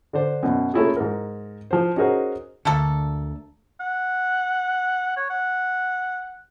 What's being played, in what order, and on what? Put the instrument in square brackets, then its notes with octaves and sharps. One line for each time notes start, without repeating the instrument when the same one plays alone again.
[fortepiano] D3 D4 C5
F#2 B2
A3 A#3 C#4 E4 F4 G#4
G#2 A#4
F3 C5
C#4 D#4 F#4 G#4 A#4 C5
[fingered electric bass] D2 D3 [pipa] A3 A#3 A4
[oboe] F#5
C#5
F#5